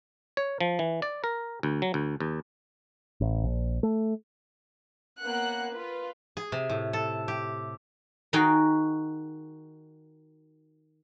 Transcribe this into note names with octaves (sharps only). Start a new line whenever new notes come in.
C#5
F3
E3
D5
A#4
D2
F#3
D2
D#2
A1
A#1
A3
A#3 B3 C#4 F#5 F#6
F4 B4
G#4
C3
A2
A4
G4
D#3 D#4 F#4 G#4 G5